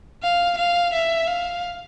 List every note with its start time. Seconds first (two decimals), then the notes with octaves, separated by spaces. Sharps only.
0.23 F5
0.58 F5
0.93 E5
1.27 F5